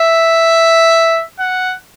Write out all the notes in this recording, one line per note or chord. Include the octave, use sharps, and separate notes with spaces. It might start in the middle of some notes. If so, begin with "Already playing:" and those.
Already playing: E5
F#5